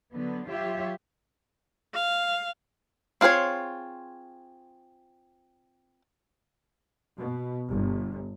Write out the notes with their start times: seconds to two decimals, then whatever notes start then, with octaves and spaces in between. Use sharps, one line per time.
0.13 D3 F#3 B3
0.48 F#3 F4 G4 C#5 E5
1.95 F5
3.21 C4 F4 G#4 C5 C#5
7.17 B2
7.69 G1